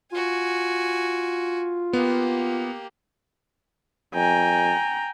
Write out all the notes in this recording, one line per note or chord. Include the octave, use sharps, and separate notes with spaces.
F4 F#4 G#5
A#3 B3 G4
F2 G5 G#5 A#5